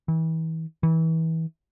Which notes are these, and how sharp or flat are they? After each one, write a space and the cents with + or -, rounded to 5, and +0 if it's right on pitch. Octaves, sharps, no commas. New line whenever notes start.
E3 -35
E3 -30